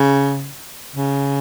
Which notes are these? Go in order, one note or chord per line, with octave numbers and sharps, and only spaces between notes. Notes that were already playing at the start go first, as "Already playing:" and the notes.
Already playing: C#3
C#3